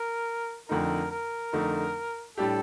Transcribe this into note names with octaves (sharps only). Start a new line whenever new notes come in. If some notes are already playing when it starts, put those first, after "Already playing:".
Already playing: A#4
F2 D3 A3 D#4 A#4
A#4
F2 D3 A3 D#4
A2 G3 D4 G4 A4